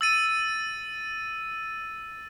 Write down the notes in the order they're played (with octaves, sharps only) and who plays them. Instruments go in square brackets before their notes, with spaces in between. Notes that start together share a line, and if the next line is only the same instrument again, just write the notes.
[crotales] E6 A6 D#7